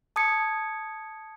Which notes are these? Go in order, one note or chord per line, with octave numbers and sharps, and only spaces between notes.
A5 D#6 G#6 C#7